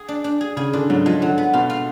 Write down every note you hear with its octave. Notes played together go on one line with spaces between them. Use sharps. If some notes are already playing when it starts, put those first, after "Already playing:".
Already playing: G#4
D4
D4
G#4
C#3 G#4
D3 D4
G#2 F#3
F3 G#3
D3 F#3
B3
B2 F4
F4